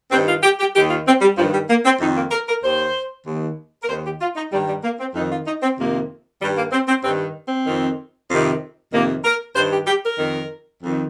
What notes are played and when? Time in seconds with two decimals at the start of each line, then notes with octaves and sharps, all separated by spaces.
0.11 G2 D#3 C4
0.28 F4
0.43 G4
0.59 G4
0.75 D#2 D#3 G4
0.90 F4
1.07 C4
1.21 G3
1.37 G2 F3
1.41 D#3
1.54 G3
1.69 A#3
1.85 C4
2.00 F2 D#3 D#4
2.16 A#3
2.31 A#4
2.48 A#4
2.63 D#2 D#3 C5
3.26 D#2 D#3
3.83 A#4
3.89 D#2 D#3 C5
4.05 G4
4.21 F4
4.36 D#4
4.52 G2 D#3 G3
4.68 G3
4.84 A#3
5.00 C4
5.15 F2 D#4
5.20 D#3
5.31 F4
5.46 D#4
5.62 C4
5.78 F2 C3 D#3 A#3
6.40 G2 D#3 G3
6.57 A#3
6.72 C4
6.88 C4
7.03 G2 D#3 C4
7.45 C4
7.67 F2 D#3
8.30 F2 C3 D#3
8.93 F2 C3 D#3 A#3
9.24 A#4
9.56 G2 D#3 C5
9.72 G4
9.87 G4
10.03 A#4
10.18 F2 D#3
10.82 F2 D#3